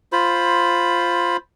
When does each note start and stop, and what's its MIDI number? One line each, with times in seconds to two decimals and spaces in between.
0.12 1.37 65
0.12 1.37 72
0.12 1.37 83